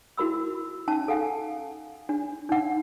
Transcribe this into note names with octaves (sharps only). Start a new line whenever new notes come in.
E4 F#4 A#4 B5 E6
C#4 D#4 A5
A4 F5 F#5 G#5
D4
D#4 F#5